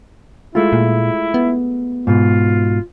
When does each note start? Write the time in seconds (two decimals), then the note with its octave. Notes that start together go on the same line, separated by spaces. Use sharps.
0.55 G#3 A3 E4 F4
0.73 A#2
1.34 B3
2.07 G#2 B2 F4